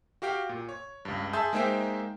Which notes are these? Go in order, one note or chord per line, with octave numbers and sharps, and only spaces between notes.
F#4 G4 F5 G5
A#2
C#5
C#2 G2
G#4 E5 A5 C6 D#6 G6
G#3 A#3 D#4 C5 E5 G5